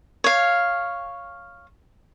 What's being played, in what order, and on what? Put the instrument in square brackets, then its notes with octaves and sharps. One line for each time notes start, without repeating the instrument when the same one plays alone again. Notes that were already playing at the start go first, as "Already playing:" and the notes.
[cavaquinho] C#5 F5